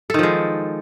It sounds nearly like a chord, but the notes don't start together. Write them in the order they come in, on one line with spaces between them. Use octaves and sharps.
A4 D#3 F3 G#3